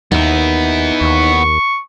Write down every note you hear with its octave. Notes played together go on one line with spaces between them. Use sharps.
D#2 B3 D#4 E4
D#2 C#6